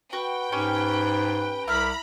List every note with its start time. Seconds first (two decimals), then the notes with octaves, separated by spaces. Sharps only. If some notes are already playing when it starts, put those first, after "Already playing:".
0.13 F#4 B4 G5
0.52 G#2 C#4 G4 C#5
1.68 C2 E4 A#5 B5 F6